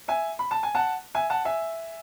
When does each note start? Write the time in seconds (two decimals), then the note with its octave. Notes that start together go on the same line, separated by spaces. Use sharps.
0.08 E5 G#5
0.39 B5
0.51 A5
0.63 G#5
0.75 F#5 A5
1.15 E5 G#5
1.30 F#5 A5
1.45 E5 G#5